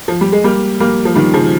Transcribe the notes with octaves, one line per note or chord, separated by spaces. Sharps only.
F3
G3
G#3
G3 A#3
G3 A#3
F3
D#3 G3
C#3 F3